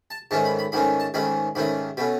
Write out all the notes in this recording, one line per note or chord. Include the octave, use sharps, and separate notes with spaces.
A5
G#2 D#3 A3 C#4 A5
B5
B5
G#2 D#3 A3 C#4 B5
A5
G#2 D#3 A3 C#4 B5
G#2 D#3 A3 C#4 B5
B2 A3 C#4 B5